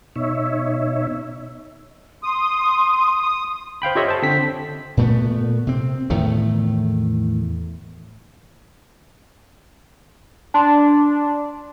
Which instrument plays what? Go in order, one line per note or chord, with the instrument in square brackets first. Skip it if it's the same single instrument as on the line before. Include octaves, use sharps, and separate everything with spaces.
[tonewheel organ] B2 D#4 C#5 E5
[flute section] C6 [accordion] D#6
[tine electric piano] C5 F5 G5 B5
F4 G4 A4 C#5 D#5 E5
C5 A5
D3 C4 B6
[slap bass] A#2 A3 B3
C3 C4
E2 A2 D#3 A3
[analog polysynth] D4 [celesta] A5 C6